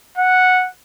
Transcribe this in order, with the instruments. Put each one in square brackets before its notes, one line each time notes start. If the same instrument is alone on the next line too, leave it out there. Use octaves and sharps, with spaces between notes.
[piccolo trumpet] F#5